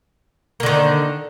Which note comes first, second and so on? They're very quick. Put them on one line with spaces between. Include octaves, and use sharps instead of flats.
A#3 D3 D#3